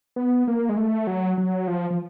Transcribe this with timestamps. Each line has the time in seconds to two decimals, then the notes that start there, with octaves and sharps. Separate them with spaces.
0.16 B3
0.47 A#3
0.69 G#3
0.77 A3
1.07 F#3
1.38 F#3
1.68 F3
1.90 F3